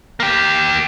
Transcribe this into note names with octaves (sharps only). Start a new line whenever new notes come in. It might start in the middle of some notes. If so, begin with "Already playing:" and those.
A#3 G4